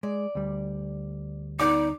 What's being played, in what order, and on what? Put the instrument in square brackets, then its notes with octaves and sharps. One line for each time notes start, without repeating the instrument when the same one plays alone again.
[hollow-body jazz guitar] G#3 [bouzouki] D5
[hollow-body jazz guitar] D2 G3
[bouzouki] B3 D5 [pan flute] D#4 [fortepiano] D6